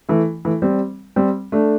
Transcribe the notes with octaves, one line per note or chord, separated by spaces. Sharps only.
E3 A3
E3 A3
G3 C4
G3 C4
A3 D4